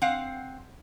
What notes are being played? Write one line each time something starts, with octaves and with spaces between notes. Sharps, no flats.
C4 F5 F#5